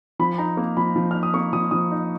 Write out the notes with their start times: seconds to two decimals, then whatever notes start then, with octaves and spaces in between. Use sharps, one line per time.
0.19 F3 B5
0.38 D#4 A#5
0.57 A#3
0.77 F3 B5
0.96 F3
1.11 D#4 F6
1.23 D#6
1.34 A#3 C#6
1.53 F3 D#6
1.71 F3 D#6
1.91 D#4